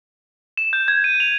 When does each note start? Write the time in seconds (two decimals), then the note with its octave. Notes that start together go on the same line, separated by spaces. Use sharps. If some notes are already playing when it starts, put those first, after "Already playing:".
0.57 E7
0.73 G6
0.88 G#6
1.04 D#7
1.20 F7